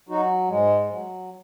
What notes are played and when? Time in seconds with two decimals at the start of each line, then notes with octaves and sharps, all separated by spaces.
0.09 F#3 D#4 F#4
0.49 G#2 G#3
0.90 F#3